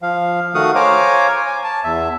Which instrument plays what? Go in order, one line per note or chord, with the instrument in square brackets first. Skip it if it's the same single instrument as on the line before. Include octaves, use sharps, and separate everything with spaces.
[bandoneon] F3 F5
D#3 A3 F#4 F5 F#5 D#6
C5 C#5 F5 G#5 A#5 D6
G#5
A5
E2 E5